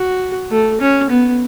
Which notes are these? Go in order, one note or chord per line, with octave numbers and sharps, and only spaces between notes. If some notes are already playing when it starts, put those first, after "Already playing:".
Already playing: F#4
A3
C#4
B3